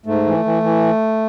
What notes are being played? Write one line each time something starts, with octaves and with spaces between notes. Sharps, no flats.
G#2 A3
E3
E3
E3